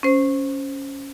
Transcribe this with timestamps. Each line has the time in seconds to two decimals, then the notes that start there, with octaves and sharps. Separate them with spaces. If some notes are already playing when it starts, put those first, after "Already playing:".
0.03 C#4 C5